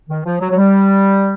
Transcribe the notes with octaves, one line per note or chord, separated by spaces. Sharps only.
D#3
F3
F#3
F#3
G3